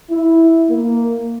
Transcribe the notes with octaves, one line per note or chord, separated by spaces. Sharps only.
E4
A#3